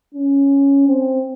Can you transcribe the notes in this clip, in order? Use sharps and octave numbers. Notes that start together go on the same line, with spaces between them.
C#4
C4